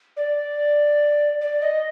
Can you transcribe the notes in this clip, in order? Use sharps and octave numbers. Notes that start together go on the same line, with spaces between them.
D5
D5
D#5